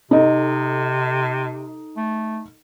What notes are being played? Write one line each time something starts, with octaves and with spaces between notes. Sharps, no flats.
C3 D#4 A4 D#5
A3